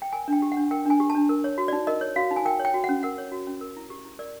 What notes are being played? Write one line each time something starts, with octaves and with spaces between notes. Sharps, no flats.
G5
A#4 G#5
D4 G5
G4
F#5
D4
A#4 G5
D4 G#5
G4
A5
D4
A#4
C#5
F#4
D#4 D5
A#4 D#5
C#5
F#4 F5
D#4
G#5
A#4 G5
C#5
G5
F#4
F#5
C#4
A#4 F#5
C#5
F#4
C#4
A#4
E4
G4
E4
A#4 D5